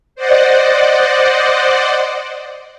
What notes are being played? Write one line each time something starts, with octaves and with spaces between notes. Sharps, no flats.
C5 D5 D#5 F#5